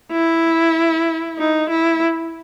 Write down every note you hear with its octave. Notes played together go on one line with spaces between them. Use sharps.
E4
D#4
E4